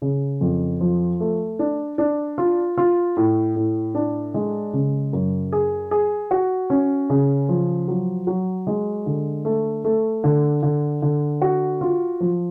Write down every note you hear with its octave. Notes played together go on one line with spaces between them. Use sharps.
C#3
F2
F3
A3
D4
D4
F4
F4
A2
A2
D4
G#3
C#3
F#2
G#4
G#4
F#4
C#4
C#3
F3
F#3
F#3
G#3
D3
A3
A3
D3
D3
D3
F#4
F4
F3